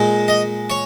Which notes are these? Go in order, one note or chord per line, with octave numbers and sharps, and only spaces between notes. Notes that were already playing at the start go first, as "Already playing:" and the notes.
Already playing: A#2 G#3
D#5
C#5